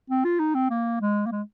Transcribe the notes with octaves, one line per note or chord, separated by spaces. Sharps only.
C4
F4
D#4
C4
A#3
G#3
A#3
G#3